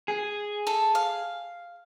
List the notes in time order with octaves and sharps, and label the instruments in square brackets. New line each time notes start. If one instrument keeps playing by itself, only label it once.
[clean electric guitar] G#4
[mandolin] A4
F5